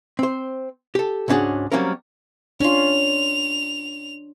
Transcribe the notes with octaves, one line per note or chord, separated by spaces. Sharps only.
C4 C5
G4 A4
C#2 G#2 C#4 D4 F#4 G#4
F#3 G3 A#3 C4 C#4 A#4
C#4 D4 F4 F7